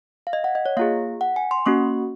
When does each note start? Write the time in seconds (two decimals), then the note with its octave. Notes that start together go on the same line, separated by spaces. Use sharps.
0.27 F5
0.33 D#5
0.44 F#5
0.55 D#5
0.66 C#5
0.77 A#3 F4 G#4 F5
1.21 F#5
1.36 G#5
1.51 C6
1.66 A#3 C#4 F#4 C#6